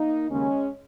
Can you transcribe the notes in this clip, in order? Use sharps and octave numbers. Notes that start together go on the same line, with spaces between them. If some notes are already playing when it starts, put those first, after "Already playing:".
Already playing: A#3 D#4
D#2 C#3 G#3 C#4